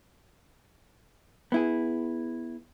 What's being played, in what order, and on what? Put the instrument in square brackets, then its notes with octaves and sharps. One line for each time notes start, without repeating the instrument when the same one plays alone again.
[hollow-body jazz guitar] B3 E4 G#4